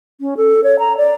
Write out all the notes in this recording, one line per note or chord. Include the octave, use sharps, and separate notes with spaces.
C#4
A4
C#5
A#5
D5